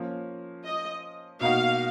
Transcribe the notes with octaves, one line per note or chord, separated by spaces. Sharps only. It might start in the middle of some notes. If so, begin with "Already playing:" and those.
Already playing: F3 A#3 C#4
D#5
B2 A#3 D#4 F#4 F5